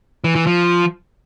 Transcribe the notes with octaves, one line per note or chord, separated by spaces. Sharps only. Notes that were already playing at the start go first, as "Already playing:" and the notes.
E3
E3
F3